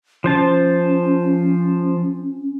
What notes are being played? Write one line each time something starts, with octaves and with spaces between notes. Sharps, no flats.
F3 C#4 C5 A5